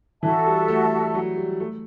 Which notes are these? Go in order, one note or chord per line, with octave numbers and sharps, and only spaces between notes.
E3 F#4 A4 E5 A5
G3
A3
F#3
G3
A3